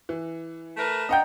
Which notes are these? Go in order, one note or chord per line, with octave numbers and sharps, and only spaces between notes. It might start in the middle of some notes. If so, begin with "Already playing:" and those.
E3
A3 A#4 B4
D4 D#5 F#5 G5 A#5 G6